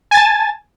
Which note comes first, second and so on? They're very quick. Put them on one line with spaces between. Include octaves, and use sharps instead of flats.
G#5 A6 A5